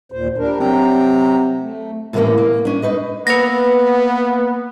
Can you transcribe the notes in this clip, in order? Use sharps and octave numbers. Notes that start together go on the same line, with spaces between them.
D#2 A#2 C5
G3 D4 A#4
C3 F#3 G5 A#5
A3
A2 C3 E3 A3 A#3 C#4
A#3
C#4 D4
D#4 B4 D#5
A#3 B3 B4 A#6